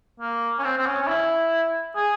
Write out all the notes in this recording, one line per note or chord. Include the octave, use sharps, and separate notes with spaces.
A#3
C#4
C4
C4
C#4
C#4
E4
G#4